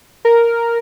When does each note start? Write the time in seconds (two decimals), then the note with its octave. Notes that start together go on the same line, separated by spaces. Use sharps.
0.25 A#4